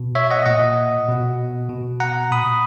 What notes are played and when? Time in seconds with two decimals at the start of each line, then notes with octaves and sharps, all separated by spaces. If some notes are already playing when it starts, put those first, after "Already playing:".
Already playing: B2
0.15 C#5 E5
0.31 D#5 F#5
0.46 A#2 D#5 F#5
1.08 B2
1.70 B2
2.00 F#5 A#5
2.31 A#2 B5 D#6